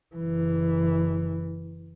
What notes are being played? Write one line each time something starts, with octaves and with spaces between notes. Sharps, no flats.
F#1 E3